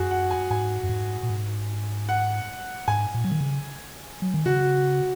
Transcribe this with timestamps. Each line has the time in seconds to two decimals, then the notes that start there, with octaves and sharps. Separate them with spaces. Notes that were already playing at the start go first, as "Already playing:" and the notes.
Already playing: F#2 F#4 G#4
0.11 F#5
0.31 G#5
0.50 G#2 G#5
0.83 F#2
0.89 G#2
1.23 A#2
1.30 G#2
2.09 F#5
2.88 G#2 G#5
3.14 A#2
3.24 F#3
3.32 D#3
3.41 C#3
4.22 F#3
4.34 D#3
4.46 C#3 F#4